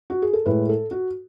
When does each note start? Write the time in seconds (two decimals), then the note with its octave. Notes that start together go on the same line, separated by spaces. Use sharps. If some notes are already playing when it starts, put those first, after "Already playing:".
0.10 F#4
0.22 G#4
0.33 A4
0.46 A2 G#3 B4
0.69 A4
0.91 F#4